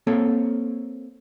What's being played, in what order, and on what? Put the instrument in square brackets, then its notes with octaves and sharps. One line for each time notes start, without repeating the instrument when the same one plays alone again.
[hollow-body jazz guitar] A#3 C4 A4 C#5